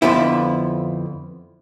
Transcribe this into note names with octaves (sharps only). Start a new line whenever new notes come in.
F2 D3 F3 B3 E4